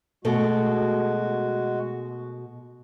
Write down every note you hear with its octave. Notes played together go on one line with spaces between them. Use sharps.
B2 G#3 A3 F#4 A4